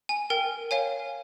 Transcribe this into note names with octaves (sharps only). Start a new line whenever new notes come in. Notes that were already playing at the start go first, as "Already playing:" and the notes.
G#5
A#4 G5
C#5 F5 G#5